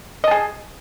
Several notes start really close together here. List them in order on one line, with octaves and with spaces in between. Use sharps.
D#5 A5 G#4